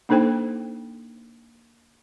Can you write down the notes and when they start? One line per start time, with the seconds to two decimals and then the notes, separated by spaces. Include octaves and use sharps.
0.09 A#3 D4 D#4 A4 C5 G5